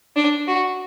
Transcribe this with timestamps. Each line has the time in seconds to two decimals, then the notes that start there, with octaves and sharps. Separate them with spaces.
0.16 D4
0.48 F#4